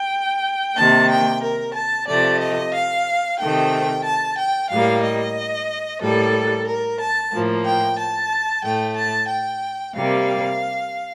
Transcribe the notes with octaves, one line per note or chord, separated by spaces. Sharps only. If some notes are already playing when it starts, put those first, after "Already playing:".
Already playing: G5
C3 D#3 A#3 A5
G5
A#4
A5
C3 F3 A3 D5
D#5
F5
C3 D#3 A3 G5
A5
G5
A2 G3 A#3 F5
D#5
A2 G3 A#3 A4
A#4
A5
A2 F3 A#3
G5
A5
A2 A3 G5
A5
G5
C3 G3 A#3 F5